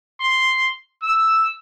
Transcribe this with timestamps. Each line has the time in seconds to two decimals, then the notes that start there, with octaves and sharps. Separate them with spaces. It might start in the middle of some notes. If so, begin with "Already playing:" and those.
0.21 C6
1.02 E6